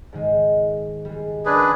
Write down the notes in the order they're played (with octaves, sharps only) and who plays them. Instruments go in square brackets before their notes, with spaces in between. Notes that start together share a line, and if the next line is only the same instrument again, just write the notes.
[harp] G#2 D#3 G#3
G3 G#3
[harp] C#4 A#4 [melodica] D4 G#4 B4